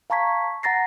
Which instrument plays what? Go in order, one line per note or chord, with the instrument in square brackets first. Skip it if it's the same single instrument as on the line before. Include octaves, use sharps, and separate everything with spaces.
[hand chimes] F5 A5 A#5 C#6 G#6 B6
F#5 A#5 A6 A#6 C7